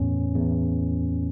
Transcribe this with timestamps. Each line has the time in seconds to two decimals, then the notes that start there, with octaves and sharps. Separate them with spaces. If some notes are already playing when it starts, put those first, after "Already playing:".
Already playing: E2 A2 C#4
0.35 E2